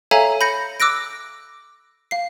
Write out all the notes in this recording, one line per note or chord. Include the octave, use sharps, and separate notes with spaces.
A4 C#5 E5 F5 G#5 A#5
B5 G6 A#6 C#7
D6 E6 F#6 A#6 D7
F5 C7